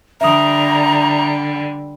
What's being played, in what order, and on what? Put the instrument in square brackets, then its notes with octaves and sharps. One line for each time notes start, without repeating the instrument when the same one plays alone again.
[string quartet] D3 G3 [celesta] E5 D#6 [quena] A#5